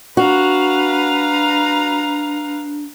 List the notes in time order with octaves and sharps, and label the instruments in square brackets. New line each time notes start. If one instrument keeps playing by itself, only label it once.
[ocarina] D4 [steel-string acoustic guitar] F#4 [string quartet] B4 F5 A#5